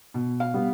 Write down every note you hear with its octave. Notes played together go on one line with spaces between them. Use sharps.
B2
F5
G3 B3